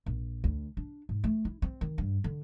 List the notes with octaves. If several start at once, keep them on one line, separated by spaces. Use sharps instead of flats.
A#1
D2
D4
G#2
A3
E4
C4
D#3
G2
D3